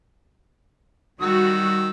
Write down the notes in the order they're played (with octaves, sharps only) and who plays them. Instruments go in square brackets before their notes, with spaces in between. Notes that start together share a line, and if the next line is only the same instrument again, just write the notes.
[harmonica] D#3 E6 [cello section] G3 F#4